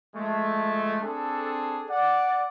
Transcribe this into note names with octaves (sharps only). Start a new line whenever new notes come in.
F3 G#3 A3
C4 D4 G#4 A4
D5 F#5